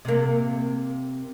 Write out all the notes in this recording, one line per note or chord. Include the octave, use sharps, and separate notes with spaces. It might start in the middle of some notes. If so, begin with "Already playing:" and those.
C3 A#3